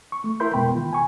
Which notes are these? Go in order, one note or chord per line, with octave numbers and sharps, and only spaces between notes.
C#6
A3
E4 A#4 E5 B5 C6 G6
F2 B2 G#3 B3 G5 B5
D#3 F4
G#5 C#6